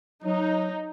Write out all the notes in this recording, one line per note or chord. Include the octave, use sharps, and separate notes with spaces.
F#3 D#4